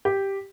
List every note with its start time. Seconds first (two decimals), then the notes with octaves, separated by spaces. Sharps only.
0.05 G4